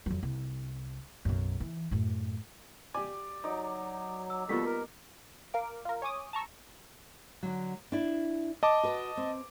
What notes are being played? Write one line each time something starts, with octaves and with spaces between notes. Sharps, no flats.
F2 F#3
C2
B1 F#2
E3
F#2 A2
G4 D5 G#5
F#3 D#4 D5
E6
G3 A#3 B3 F4 F#4 A4 B6
A#4
A#4 F5 D6
F4 A#4
C#5 G#5 D6 D#6
A5 A#5 C#6 E6
D3 F#3
D4 E4
D#5 A5 D6
F#4 B4
C4